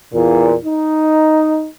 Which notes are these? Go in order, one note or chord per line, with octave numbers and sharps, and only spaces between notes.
E2 A#2
D#4